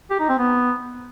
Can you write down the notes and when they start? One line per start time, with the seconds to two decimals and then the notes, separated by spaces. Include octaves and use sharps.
0.10 G4
0.20 D#4
0.29 C4
0.38 B3